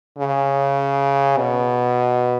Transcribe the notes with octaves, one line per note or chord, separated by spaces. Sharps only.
C#3
B2